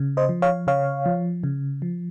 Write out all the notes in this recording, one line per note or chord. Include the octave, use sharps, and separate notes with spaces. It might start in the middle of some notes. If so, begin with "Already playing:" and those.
Already playing: C#3
C5 D#5
F3
C#5 F5
C#3 C#5 F5
F3
C#3
F3